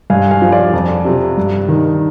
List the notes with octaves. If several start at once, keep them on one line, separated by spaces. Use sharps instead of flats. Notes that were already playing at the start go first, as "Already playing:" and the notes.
G2 F5 G#5
F5 G#5
F3
D5 F5
F2
C3 F3
G2
D#3